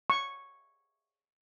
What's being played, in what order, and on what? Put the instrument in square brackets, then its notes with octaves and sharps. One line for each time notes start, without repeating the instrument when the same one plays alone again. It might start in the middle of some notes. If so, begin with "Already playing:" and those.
[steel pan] C#6